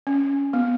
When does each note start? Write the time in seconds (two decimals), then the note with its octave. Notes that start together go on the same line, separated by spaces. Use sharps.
0.07 C#4
0.53 B3